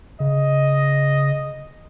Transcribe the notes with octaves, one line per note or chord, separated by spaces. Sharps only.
C#3 D#5